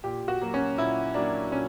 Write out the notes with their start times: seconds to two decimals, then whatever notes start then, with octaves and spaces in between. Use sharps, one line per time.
0.04 A#2 G4
0.28 F#4
0.41 F#3 A#3
0.54 C#4
0.78 A#2 E4
1.14 F#3 A#3 D4
1.51 A#2 C#4